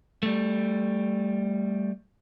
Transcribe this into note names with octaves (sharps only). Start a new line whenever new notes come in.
G3 A3